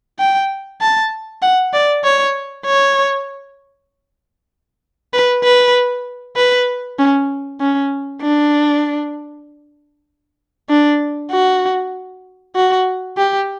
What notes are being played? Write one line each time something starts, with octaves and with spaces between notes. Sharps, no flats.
G5
A5
F#5
D5
C#5
C#5
B4
B4
B4
C#4
C#4
D4
D4
F#4
F#4
G4